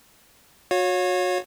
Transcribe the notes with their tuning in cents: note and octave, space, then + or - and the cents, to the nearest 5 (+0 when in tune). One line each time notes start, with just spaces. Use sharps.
F#4 -30 C#5 +0 F5 +40